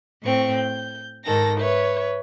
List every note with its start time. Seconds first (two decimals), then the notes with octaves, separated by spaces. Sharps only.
0.23 A2 C4 C#6
0.55 G6
1.25 G#2 D#3 A4 A#6
1.59 B4 C#5 E5